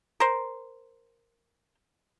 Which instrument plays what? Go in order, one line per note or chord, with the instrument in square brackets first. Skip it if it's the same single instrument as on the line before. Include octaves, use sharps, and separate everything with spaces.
[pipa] A#4 C5